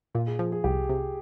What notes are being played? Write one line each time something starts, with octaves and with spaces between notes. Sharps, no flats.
A#2 F4
G#4
F3
G#4
C2 G4
C3